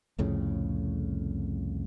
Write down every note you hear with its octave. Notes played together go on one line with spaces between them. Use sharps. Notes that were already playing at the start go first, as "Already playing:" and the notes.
C2 F2 A2 C#3